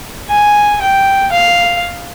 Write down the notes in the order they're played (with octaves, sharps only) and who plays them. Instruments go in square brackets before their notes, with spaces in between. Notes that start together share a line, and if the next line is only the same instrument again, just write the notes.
[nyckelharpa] G#5
G5
F5